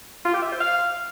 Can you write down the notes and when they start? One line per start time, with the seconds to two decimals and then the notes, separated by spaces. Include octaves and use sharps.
0.25 F4
0.34 G4
0.42 E5
0.51 C5
0.60 F5